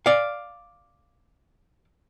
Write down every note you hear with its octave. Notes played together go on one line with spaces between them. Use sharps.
D5 F5